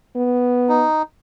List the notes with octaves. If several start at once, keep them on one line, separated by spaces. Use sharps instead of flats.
B3
D#4